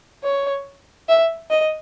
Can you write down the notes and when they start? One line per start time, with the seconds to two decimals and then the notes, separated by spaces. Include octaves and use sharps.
0.24 C#5
1.08 E5
1.51 D#5